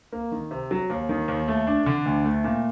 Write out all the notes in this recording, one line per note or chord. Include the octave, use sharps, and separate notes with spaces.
A#3
D#3
C3
F#3
D#2
D#3
D#2
A3
D4
D3
D2
A3
A#2